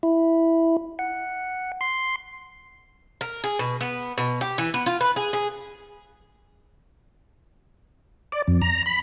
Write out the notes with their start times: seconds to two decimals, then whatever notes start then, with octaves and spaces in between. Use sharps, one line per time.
0.03 E4
0.99 F#5
1.81 C6
3.21 A#4
3.44 G#4
3.59 B2
3.81 B3
4.18 B2
4.41 G4
4.58 E3
4.74 B3
4.86 F4
5.01 B4
5.16 G#4
5.33 G#4
8.32 D5
8.47 F2
8.61 A#5
8.86 B5